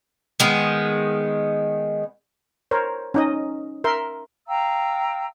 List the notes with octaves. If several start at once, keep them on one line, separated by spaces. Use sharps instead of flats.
D#3 G#3 B3
A#4 C5 C#5
C#4 D#4 D#5
A#4 E5 C6
F5 G5 A#5 E6